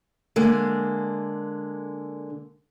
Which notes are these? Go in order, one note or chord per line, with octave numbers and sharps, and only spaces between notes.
D3 G#3 A#3